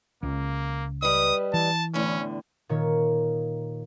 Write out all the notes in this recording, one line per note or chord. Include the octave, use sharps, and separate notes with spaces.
C#2 C#3 A#3
G3 B4 D#5 D#6
E3 A5
E2 A2 D3 C#4
A#2 D#3 C#5